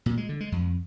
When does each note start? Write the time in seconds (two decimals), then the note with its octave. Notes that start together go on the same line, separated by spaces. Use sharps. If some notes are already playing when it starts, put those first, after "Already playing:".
0.06 A#2
0.17 G#3
0.29 D3
0.40 G#3
0.52 F2